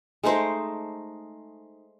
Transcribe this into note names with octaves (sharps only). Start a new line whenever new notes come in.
G#3 A3 D#4 C5